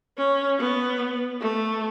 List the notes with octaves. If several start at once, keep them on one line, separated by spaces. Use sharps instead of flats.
C#4
B3
A3